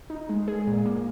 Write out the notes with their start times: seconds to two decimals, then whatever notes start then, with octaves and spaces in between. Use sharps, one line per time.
0.10 D#4
0.29 G#3
0.48 G#4
0.68 A#2
0.86 A#3